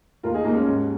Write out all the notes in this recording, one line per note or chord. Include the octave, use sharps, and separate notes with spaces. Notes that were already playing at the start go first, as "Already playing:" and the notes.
D#2 F4 A#4
D#4 G#4
D#2 A#3 D#4
G#3 C#4
G#2